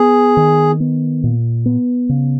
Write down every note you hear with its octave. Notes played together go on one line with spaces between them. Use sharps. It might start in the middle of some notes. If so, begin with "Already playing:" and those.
Already playing: B3 G#4
D#3
B3
A#2
B3
C#3